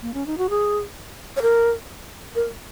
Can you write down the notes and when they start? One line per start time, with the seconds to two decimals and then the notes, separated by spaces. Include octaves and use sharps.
0.02 A#3
0.14 C#4
0.27 D#4
0.38 F#4
0.50 G#4
1.37 C#5
1.42 A#4
2.35 A#4